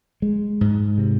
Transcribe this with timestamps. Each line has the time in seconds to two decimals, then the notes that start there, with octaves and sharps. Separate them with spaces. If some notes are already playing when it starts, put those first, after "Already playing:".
0.22 G#3
0.61 G#2
0.98 C3